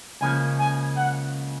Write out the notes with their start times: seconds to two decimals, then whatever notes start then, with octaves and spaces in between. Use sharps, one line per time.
0.21 C#2 C#3 F3 A#3 C#4 G#5
0.60 G#5
0.97 F#5